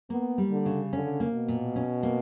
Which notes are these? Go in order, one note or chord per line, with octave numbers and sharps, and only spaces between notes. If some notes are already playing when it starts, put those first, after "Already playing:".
A#3 B3
G3
D3
C#3
D3 C#4
A#3
B2
A#2
C#4
A#3